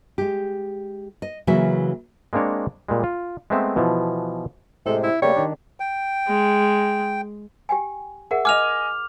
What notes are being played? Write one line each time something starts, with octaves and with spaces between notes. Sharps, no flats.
G#3 G4
D#5
C#3 E3 F#3 A#3 F#4 E5
G#3 A#3 C4 D4 C#5
A#2 G3 G#3
F4
G#3 A3 B3 C4 E5
B2 E3 F3
A2 C3 G#3 A4
E4
C#3 G3 A3 A#3 C#5
D#3 D4
G5
G#3
G4 G5 G#5
G#4 A#4 E5 F#5
D#5 G#5 D6 F6 F7